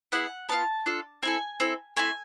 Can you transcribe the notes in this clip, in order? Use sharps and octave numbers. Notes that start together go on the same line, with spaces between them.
B3 E4 G#4 F#5
B3 D4 F4 A5
D4 F4 A4
C4 E4 A4 G#5
C4 E4 A4
A3 C4 E4 G#5